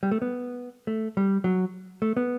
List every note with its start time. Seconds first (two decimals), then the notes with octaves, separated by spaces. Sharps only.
0.03 G3
0.11 A3
0.22 B3
0.87 A3
1.17 G3
1.44 F#3
2.02 A3
2.17 B3